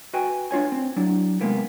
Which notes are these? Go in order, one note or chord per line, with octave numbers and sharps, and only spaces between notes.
F#4 B4 D#5 G5 G#5
D4 F4 C#5 G#5
C4
F#3 D4 E4
C3 G#3 A#3 B3